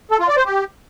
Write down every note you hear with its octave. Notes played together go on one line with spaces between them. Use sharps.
A4
F4
D5
C5
G4